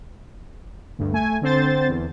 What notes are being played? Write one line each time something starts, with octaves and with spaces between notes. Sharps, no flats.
D2 G2
A3 G#5
D3 C4 C5 A6
E2